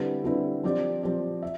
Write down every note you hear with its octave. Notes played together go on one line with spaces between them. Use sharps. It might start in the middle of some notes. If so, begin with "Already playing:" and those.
Already playing: D3 G3 C4 E4 B4
D3 G3 C4 E4 B4
F3 C4 G4 D5
F3 C4 G4 D5
E5